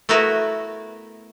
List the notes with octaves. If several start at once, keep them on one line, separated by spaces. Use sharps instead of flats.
A3 B3 E4 F#4 A#4 B4